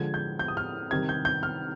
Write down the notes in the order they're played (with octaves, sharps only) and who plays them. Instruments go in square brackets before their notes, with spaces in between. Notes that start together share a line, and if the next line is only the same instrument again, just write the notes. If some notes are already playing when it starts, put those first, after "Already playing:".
Already playing: [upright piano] D3 F3 G#3 G#6
G6
G6
D#6
F6
C3 D#3 G3 G#6
G6
G6
F6